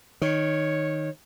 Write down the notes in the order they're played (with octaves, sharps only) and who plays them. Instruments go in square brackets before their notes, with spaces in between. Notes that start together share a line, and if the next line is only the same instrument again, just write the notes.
[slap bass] D#3 [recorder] C#5